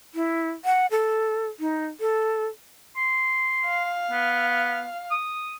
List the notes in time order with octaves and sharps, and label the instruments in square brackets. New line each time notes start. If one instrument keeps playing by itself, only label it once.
[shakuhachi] E4
F#5
A4
D#4
A4
[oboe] C6
[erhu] F5
[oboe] B3
D#6